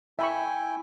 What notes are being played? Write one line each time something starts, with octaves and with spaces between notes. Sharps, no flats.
E4 E5 G5 G#5 B5 C#6